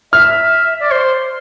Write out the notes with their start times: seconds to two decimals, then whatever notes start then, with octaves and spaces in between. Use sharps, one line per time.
0.12 E5 F6
0.80 D5
0.91 C5